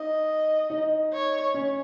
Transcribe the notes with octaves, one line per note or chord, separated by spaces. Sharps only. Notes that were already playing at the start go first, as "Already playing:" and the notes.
Already playing: D#4 D#5
D#4
C#5
C#4